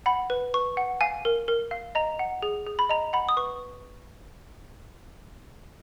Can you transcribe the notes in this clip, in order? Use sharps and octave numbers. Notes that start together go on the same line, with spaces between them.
F#5 B5
B4
B4 C#6
F#5
F5 G#5
A#4
A#4
F5
D#5 A#5
F#5
G#4
G#4
B5
D#5 A#5
F#5 B5
D#6
B4 C#6